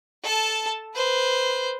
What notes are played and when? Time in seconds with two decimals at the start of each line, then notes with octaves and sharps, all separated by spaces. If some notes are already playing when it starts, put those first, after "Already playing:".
0.23 A4 A5
0.95 B4 C5